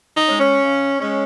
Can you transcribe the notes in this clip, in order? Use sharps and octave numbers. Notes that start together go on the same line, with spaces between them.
D#4
G#3 C#4
C#4
C#3
G#3 C#4